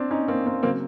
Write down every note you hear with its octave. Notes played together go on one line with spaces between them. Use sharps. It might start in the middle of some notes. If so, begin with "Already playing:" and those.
Already playing: C4 D4
C#4 D#4
A#3 C4
A#3 C4
C#3 F#3 A#3 C4